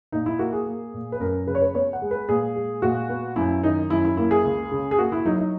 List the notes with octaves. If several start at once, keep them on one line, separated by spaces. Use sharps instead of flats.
A#2 D#4
E4
A#3 F#4
G#4
A#3
A#2
B4
F#2 A#4
C#3 B4
C#5
B4
B3 C#5
F#5
G#3
B4
A#2 G#4
G#3
A#2 F#4
B3
F#2 E4
D#3 D#4
F#2 E4
E4
A#3 E4
G#4
C#2
C#3
G#4
A#3 F#4
E4
F#3 D#4
D#4